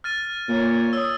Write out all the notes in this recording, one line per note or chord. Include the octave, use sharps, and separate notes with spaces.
F6 A6 D#7
A#2 C#5
D#6 E6